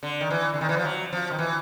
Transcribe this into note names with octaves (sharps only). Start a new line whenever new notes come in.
D3
D#3
E3
D3
D#3
E3
F3
F#3
F3
D#3
E3